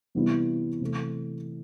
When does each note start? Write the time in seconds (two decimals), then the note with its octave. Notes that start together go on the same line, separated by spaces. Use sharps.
0.15 C3 E3 G3 B3 E4
0.81 C3 E3 A3